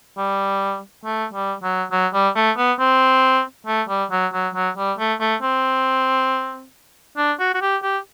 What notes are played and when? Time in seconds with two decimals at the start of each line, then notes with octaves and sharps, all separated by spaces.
0.18 G3
1.05 A3
1.33 G3
1.63 F#3
1.92 F#3
2.14 G3
2.36 A3
2.57 B3
2.79 C4
3.67 A3
3.89 G3
4.11 F#3
4.33 F#3
4.54 F#3
4.77 G3
4.99 A3
5.20 A3
5.42 C4
7.17 D4
7.40 F#4
7.54 F#4
7.61 G4
7.83 G4